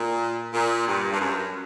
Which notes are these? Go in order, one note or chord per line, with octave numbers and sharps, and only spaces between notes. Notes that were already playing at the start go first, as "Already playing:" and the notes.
Already playing: A#2
A#2
G2
G2
F#2